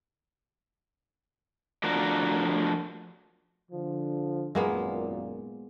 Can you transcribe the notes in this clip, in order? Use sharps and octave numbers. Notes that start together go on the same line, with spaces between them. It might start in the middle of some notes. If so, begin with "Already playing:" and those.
F3 A3 D4 F#4 A#4
D3 F3
G#1 F#2 A#2 G#3 A#3 B3